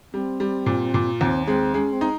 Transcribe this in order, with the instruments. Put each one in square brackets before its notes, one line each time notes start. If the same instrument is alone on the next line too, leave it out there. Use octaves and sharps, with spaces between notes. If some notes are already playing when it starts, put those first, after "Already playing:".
[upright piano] G3 [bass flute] C4
[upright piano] G3
A#2
A#2
[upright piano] D#2 [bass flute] C4
[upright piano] G#3 [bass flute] C4
[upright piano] G#3 [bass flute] C#4
[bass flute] C4
[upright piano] D#4